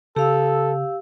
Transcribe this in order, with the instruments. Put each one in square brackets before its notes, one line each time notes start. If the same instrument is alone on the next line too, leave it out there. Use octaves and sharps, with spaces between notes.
[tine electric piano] C#3 [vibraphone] G4 F5 E6 [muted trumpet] A4